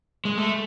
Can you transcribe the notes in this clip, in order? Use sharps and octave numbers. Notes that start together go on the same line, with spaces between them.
G#3
A3